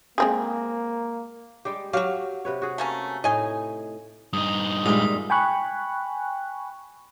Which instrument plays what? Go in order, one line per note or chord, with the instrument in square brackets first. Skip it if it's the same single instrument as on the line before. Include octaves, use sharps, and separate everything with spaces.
[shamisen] G#3 C4 G#4 [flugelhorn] A#3
[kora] G3 G#3 G4
[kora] F#3 G4 [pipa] F#4 F5
[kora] C3 B4 C#5
F#4 G#4
[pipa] A3 A#3 C#4
[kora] A2 D#4 [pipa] D#5 G#5
[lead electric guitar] G2 D#4 [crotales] D#6
[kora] A#2 D#3 E5 [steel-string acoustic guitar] G3 G#3 [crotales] D#6
[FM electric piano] G5 G#5 B5 C#6 F#6